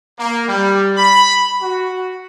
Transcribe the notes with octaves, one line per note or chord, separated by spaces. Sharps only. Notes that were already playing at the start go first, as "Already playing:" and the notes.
A#3
G3
B5
F#4